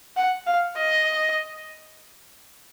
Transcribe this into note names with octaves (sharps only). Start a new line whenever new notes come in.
F#5
F5
D#5